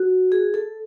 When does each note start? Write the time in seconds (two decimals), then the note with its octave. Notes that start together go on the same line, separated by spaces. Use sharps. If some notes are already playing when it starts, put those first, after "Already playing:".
Already playing: F#4
0.32 G#4
0.54 A4